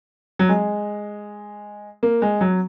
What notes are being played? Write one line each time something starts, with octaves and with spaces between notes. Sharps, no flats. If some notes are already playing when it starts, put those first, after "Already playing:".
F#3
G#3
A#3
G#3
F#3